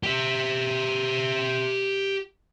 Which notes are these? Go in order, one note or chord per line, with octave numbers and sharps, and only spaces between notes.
G4 E5